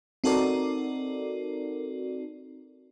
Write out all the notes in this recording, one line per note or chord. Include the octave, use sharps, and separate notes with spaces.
C4 D#4 F#4 A4 A#4 D5